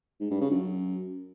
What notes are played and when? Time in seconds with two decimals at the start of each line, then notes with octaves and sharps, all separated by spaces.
0.20 G#2
0.30 G2
0.41 C#3
0.51 F#2